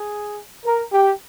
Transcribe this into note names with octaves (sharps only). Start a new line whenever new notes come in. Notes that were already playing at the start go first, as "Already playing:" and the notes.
Already playing: G#4
A#4
G4